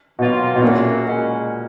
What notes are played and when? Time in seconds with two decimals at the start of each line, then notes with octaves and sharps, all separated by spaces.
0.19 B2 D#3 F#3 A#3 F4
0.55 B2
0.62 F#2 A#2 C#3 F#3 A#3
1.05 C#3 G#3 C#4 F#4 A#4